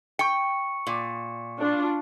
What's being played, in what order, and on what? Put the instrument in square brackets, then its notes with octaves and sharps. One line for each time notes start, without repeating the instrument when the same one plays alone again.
[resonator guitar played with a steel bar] G5 [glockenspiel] C#6 C#7
[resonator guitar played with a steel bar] A#2
[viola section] D4 F4